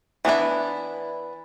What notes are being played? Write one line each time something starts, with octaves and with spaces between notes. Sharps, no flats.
E3 B3 D4 E4